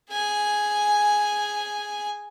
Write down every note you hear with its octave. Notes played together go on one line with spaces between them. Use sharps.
G#4 G#5